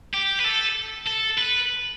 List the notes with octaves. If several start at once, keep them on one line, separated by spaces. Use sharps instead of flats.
G4
B4
A4
A4
B4